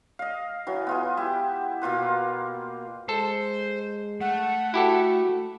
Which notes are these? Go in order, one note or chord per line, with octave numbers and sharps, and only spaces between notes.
D#5 F5
E3 F#3
B3 F4 G#4
E4 G4
B2 A#3 F4 B4
G#3 A4 C5
A3 F#5
E4 F#4 G4 A4